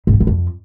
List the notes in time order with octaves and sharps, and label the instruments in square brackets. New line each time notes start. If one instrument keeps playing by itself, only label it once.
[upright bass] G#2
F3
A2
F2